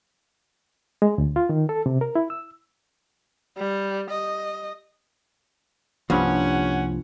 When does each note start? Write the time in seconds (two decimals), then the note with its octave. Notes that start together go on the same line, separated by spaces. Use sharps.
1.02 G#3
1.18 D2
1.36 F4
1.49 D#3
1.69 A4
1.86 C3
2.01 A#4
2.15 E4
2.30 E6
3.57 G3
4.10 D#5
6.10 C2 G2 F3 A#3 C#4 F#5